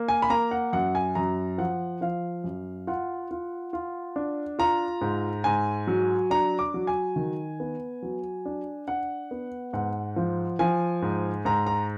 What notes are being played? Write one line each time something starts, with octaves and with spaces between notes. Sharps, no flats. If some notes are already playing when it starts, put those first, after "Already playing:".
Already playing: A#3
G#5
B5
A#3 A#5
F#5
F#2 F#5
G#5
F#2 A#5
F3 F#5
F3 F5
F#2
F4 F#5
F4
F4
D4
F4 A#5
G#2
G#2 G#5
F#3
D4 A#5
D6
F#3
G#5
D#3
B3
F#3
D4
D4 F#5
B3
G#2 F#5
F3
F3 G#5
G#2
G#2 A#5
A#5